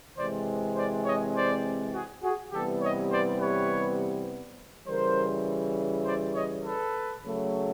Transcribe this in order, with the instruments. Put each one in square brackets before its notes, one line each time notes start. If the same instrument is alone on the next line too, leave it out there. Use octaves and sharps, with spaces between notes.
[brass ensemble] C3 E3 G#3 C4 C5 D5
C5 D5
C#5 D#5
C5 D5
F#4 G#4
F#4 G#4
C3 E3 G3 B3 G4 A4
C#5 D#5
C5 D5
B4 C#5
C#3 E3 G3 A#4 C5
C5 D5
C#5 D#5
A4 B4
C#3 F#3 A3